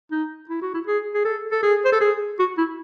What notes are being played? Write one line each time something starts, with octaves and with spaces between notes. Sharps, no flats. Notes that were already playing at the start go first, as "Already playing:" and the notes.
D#4
E4
F#4
E4
G#4
G#4
A4
A4
G#4
C5
A4
G#4
F#4
E4